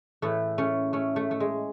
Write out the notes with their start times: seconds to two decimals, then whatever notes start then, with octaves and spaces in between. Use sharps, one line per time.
0.22 A2 E3 A3
0.58 A3 C#4
0.93 A3 C#4
1.16 A3
1.31 A3
1.40 G#3